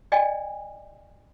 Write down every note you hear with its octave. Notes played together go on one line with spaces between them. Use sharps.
D5 D#5 G5 G#5